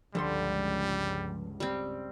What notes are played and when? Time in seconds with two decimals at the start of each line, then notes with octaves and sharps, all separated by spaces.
0.15 C#2 G2 D3 F3 G3 A4 C6
1.60 G3 C4